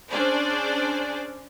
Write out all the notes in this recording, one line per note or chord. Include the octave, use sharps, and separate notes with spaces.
C#4 D4 G#4 C5 D5